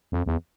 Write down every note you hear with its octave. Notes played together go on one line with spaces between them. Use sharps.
F2
E2